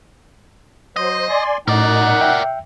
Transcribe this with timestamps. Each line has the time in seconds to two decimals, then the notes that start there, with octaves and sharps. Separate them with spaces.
0.96 F#3 C5 D#5
1.29 D5 G#5 C6
1.68 F#2 A2 D#4 A#4 D5 F#5
2.21 E5 G5